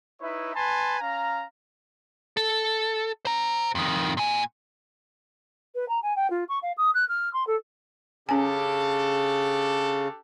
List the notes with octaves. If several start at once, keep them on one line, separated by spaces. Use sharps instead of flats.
D#4 E4 B4 C#5 E5
B4 G#5 A5 B5 C6
C#4 F5 A#5
A4
C5 A#5
F2 D#3
A#2 G#5
B4
A#5
G#5
G5
F4
C#6
F5
D#6
F#6
F6
C6
A4
C#3 C#4 D4 G4 A4 G#5